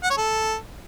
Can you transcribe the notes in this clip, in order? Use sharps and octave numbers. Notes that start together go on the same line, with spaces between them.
F#5
C#5
A4